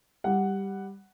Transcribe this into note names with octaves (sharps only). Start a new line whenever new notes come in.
G3 F#5